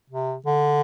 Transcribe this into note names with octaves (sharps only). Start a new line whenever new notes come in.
C3
D3